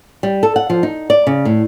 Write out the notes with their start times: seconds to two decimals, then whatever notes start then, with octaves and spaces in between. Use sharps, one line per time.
0.23 G3
0.43 A4
0.56 F#5
0.70 F3
0.83 D#4
1.10 D5
1.27 C#3
1.45 A2